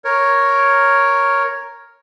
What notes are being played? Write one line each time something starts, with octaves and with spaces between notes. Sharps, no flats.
A#4 C#5